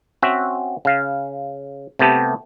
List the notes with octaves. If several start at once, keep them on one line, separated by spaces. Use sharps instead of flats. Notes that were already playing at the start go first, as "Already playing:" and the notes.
C4 C#4 F#4 E5
C#3 F5
C3 A3 B3 G4 A4